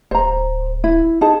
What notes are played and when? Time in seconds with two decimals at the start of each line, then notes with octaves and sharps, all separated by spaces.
0.11 D1 C5 A#5
0.84 E4
1.21 D#4 G#4 A5